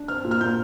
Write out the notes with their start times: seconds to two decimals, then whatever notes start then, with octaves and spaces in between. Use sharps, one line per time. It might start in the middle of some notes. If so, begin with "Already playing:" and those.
Already playing: D4
0.08 C4 F6
0.24 A#2
0.31 F6
0.41 A#2 G6